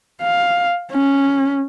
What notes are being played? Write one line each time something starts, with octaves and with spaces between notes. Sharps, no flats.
F5
C#4